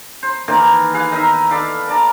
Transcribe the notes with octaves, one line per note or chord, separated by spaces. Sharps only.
C5
D#3 E3 A#3 C5
G#4 B4 F5
D#3 D#4 D#5 E5
A4 D5 F5 B5
A#4 D5 A5